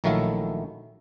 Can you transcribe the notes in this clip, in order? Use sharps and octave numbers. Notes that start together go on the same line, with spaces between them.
A#1 D#3 F#3 A3 E4 F5